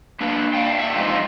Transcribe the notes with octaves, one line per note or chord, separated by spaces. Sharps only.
A#3 D4 B4
D5 F5 G5
A#2 E5
F2 G#2 D3 D#4 F4